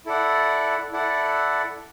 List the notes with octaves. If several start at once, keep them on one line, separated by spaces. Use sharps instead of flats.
E4 A4 D5 F#5
E4 A4 D5 F#5